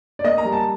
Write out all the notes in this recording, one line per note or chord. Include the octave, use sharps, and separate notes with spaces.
D5
A#3 D#5
A#5
G3
A5